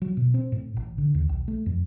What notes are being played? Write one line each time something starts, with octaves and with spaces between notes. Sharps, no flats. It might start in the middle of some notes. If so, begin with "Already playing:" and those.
F#3
B2
C4
A2
A1
D3
D#2
B1
A3
F2